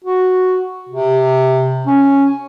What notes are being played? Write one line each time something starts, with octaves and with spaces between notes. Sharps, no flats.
F#4
C3
C#4